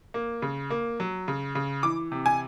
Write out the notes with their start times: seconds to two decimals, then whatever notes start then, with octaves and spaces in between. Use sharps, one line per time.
0.14 A#3
0.42 C#3
0.70 A#3
1.00 F#3
1.28 C#3
1.55 C#3
1.83 E3 D6
2.12 C3
2.26 G#5